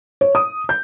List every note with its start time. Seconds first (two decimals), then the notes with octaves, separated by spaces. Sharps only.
0.21 C#5
0.35 D#6
0.69 G6